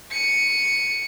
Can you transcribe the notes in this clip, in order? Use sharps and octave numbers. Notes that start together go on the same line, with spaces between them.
C#7 D#7